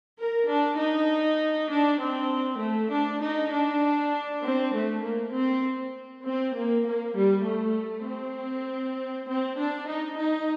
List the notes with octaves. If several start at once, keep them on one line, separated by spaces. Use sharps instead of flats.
A#4
D4
D#4
D4
C4
A3
D4
D#4
D4
C4
A3
A#3
C4
C4
A#3
A#3
G3
A3
C4
C4
D4
D#4
D#4